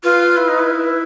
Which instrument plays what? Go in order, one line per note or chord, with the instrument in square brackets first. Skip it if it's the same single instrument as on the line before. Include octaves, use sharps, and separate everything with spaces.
[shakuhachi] F4 [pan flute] B4
[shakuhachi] E4
D#4
E4